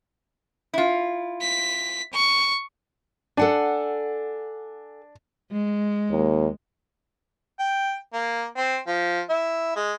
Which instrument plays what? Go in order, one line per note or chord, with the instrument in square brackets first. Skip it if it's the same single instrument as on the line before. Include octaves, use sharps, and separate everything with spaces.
[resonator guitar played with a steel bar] E4 F4
[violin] B6
C#6
[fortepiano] D4 [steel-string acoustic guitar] A4 F#5 G#5
[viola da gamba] G#3
[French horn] D#2
[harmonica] G5
A#3
C4
F3
E4
G#3